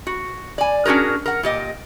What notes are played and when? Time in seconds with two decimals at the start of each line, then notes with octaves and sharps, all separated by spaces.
0.07 F#4
0.58 D5 G#5
0.86 C#4 D4 F#4 G#4 A#4
1.26 A#4 F#5
1.43 A#2 G4 D#5